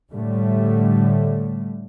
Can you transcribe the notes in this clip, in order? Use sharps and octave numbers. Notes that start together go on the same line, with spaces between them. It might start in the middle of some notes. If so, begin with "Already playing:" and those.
A2 D3 G3 A3